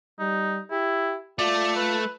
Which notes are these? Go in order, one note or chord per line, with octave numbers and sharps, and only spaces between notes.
G3 D#4
E4 G4
A3 F4 D5
B4